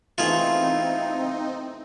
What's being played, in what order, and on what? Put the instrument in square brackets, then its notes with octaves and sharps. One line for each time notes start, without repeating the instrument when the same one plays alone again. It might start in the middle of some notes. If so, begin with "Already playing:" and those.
[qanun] E3 A3 B3 [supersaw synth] C4 D#4 [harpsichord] F4 G#4